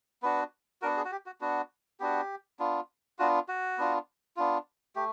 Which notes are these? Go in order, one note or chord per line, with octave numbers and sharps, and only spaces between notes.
B3 D4 F#4 B4
B3 D4 F#4 A#4
G#4
F#4
G4
F#4
B3 D4 F#4
B3 D4 F#4 G4
B3 D4 F4
B3 D4 F4 F#4
F#4
B3 D4 F4
B3 D4 F4
A3 G4